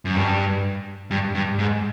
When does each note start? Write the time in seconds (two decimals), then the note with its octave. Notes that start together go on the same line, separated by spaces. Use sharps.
0.05 F#2
0.16 G2
1.11 G2
1.35 G2
1.59 G#2